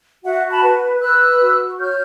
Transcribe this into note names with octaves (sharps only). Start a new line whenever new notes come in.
F#4 E5 F#5
A5 B5
B4
B4 E6 F#6
F#4
C#5 F6 G6